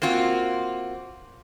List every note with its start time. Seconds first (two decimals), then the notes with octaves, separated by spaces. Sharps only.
0.02 A#3 C4 F4 F#4